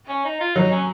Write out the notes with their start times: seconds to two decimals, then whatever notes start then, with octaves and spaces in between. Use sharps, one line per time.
0.09 C#4
0.25 D#4
0.40 F4
0.55 F#3 D#4
0.71 C#4